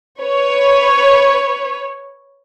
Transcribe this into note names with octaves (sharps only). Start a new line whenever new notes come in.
B4 C#5